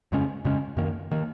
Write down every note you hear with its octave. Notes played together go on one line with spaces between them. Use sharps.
F2 C#3 G#3 C#4
F2 C#3 G#3 C#4
F#2 D#3 A#3
D#3 A#3